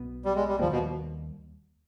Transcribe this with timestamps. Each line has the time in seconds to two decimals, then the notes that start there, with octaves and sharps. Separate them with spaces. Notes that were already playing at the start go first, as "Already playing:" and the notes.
Already playing: B1 B2 B3
0.25 G3
0.36 G#3
0.48 G3
0.59 D#2 D#3 F3 G3 A#3
0.72 B2